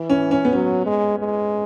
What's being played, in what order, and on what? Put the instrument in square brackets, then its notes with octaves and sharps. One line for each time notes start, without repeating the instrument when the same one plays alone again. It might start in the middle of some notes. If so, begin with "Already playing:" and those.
Already playing: [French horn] E3
[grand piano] C#4
C#4
B3
[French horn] F#3 [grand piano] C#4
[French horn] G#3
G#3